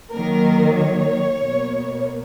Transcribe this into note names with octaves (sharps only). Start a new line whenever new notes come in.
D#3 F#3 A#3 A#4
C#5
B2 A#3